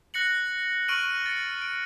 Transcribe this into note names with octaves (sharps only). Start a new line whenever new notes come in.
F#6 A#6 C#7 F#7
C#6 F6 D7 D#7 F#7
A6 C#7
D7